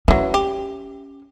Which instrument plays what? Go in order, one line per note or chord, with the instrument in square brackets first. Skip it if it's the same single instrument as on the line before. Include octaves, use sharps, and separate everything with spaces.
[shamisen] E3 F#3 [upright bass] C#4
[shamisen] G4